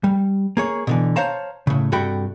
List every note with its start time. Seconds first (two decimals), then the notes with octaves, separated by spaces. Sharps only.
0.04 G3
0.57 A#3 G#4 C#5
0.87 B2 D3 E3
1.16 C5 C#5 F5 A5 A#5
1.67 A2 C#3
1.92 G2 C3 F#4 A4 G5 B5